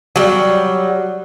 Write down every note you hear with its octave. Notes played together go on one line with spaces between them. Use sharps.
F#3 G3